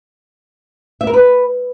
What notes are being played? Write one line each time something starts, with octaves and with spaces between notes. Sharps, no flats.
E5
A#4
B4